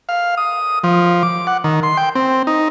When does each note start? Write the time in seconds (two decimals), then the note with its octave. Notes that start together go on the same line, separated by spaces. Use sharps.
0.09 F5
0.37 D#6
0.84 F3
1.23 D6
1.47 F#5
1.64 D#3
1.83 C6
1.97 G5
2.15 C4
2.47 D#4